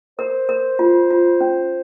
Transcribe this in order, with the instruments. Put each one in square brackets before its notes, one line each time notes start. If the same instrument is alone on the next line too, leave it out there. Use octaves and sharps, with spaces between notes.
[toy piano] A#4 [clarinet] C5
[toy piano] A#4
F4
F4
C#4